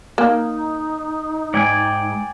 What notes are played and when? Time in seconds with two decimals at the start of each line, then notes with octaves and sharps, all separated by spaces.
0.18 A#3 D#4
1.54 G#2 D5 G5 G#5